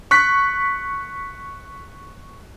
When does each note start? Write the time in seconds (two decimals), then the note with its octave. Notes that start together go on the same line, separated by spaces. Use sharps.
0.11 C#6 F#6 B6